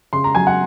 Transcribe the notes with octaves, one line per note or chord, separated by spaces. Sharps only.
C#3 C6
A#5
F#3 G#5
F#5